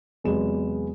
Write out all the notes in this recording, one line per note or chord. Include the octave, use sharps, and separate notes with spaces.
E2 C3 F#3 G#3 B3 E7